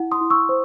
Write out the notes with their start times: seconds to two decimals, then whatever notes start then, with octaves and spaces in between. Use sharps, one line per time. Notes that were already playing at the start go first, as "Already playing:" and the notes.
Already playing: E4 F#5
0.12 C6 D#6
0.21 E4
0.30 C#6 E6
0.49 C5